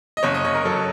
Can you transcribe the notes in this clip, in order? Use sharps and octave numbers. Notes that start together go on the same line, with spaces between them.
D#5
F#1 C#5
D#5
F#1 C#5
A#4
F#3 A4